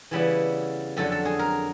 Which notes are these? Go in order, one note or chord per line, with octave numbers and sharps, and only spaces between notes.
C#3 E3 G3 B3 E4
F2 D3 F#3 A4
A4
G#4
A#4